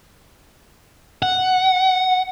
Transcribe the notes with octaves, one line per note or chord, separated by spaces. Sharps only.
F#5